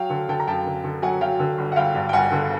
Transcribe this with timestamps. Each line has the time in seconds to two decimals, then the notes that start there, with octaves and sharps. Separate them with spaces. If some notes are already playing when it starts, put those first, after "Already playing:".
Already playing: F#3 F5 G5
0.10 D3
0.29 D3 G5 A5
0.40 A#5
0.47 F#2 G5 A5
0.66 D3
0.84 D3
1.02 F#3 F#5 G#5
1.21 F#3 F5 G5
1.40 D3
1.58 G1
1.72 F#5
1.76 G1 F5 G5
1.95 G2
2.09 G5
2.13 G1 F#5 G#5
2.32 D3